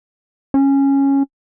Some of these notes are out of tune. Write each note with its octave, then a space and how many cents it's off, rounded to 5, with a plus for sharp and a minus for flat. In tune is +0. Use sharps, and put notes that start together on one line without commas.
C#4 -10